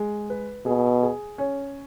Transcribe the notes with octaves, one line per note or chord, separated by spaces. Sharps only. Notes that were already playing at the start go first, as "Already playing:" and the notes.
Already playing: G#3
B4
B2 G#4
G#4
C#4